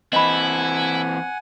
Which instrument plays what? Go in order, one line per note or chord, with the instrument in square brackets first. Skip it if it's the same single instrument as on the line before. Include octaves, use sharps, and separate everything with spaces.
[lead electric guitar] E3 C4 [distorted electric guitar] E4 [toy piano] D#5 B5 [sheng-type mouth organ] F#5 G#5